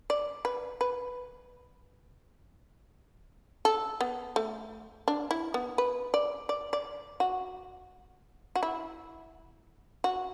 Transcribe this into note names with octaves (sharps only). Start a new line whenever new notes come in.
D5
B4
B4
A4
B3
A3
D4
E4
B3
B4
D5
D5
D5
F#4
F#4
E4
F#4